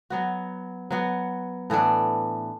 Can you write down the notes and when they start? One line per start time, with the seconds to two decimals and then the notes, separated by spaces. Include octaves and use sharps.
0.10 F#3 B3 F#4
0.91 F#3 B3 F#4
1.70 A2 E3 B3 D4